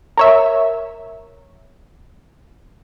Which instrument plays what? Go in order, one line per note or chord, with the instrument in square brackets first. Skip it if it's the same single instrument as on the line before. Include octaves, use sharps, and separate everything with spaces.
[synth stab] A#4 C#5 E5